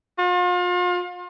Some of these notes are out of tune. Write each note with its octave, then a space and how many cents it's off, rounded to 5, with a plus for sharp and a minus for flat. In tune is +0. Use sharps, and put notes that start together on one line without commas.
F4 +40